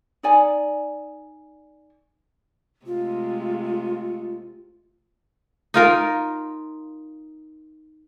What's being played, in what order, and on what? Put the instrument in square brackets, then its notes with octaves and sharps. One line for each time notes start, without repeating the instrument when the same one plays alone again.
[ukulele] D#4 D5 G#5
[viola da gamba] C3 G#3 A3 [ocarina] F4
[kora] D#4 F4 A#4